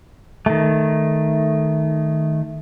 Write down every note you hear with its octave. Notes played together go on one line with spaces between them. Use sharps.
D#3 A3